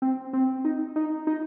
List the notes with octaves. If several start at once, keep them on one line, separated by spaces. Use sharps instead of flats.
C4
C4
D#4
D#4
D#4